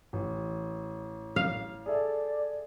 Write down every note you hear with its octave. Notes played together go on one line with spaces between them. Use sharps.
A1
F5
G#4 A4 D5 E5